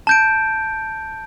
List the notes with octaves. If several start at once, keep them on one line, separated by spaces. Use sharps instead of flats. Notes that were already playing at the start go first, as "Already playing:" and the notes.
A5 G6 D7